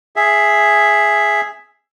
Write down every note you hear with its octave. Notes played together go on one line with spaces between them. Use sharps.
G#4 E5